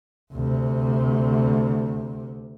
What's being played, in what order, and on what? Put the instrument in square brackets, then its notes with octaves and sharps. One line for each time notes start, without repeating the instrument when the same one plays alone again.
[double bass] D2 C3